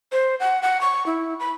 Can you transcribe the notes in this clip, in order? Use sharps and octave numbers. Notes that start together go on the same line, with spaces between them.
C5
F#5
F#5
C#6
E4
B5